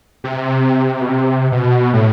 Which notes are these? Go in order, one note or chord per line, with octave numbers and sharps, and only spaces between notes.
C3
B2
C3
B2
A2